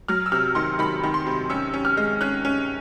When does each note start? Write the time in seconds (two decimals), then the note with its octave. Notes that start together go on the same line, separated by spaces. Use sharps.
0.08 F#3 F6
0.26 E6
0.32 C3 F6
0.55 D#3 C6
0.79 D#3 B5
1.03 D#3
1.14 C6
1.26 C3
1.50 C#4 E6
1.74 C#4
1.85 F6
1.97 G#3
2.21 C#4 F#6
2.45 C#4